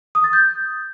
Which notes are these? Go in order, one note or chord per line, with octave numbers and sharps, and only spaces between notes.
D#6
A6
G6